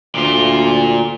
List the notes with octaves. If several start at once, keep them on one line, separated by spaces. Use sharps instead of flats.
D2 A#2 F4